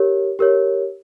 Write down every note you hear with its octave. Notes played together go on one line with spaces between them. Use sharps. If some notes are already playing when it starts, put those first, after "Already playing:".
Already playing: G4 A#4 C#5
G4 A#4 C#5